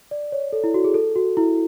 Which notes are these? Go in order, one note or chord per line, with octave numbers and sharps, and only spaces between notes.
D5
C#5
A4
E4
F#4
G#4
A4
F#4
E4